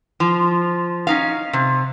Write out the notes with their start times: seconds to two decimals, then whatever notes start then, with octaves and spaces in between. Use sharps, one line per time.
0.20 F3
1.07 C#4 D#4 F5
1.53 C3